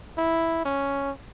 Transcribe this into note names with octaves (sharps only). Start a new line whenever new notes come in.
E4
C#4